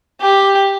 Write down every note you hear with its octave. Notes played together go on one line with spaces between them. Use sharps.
G4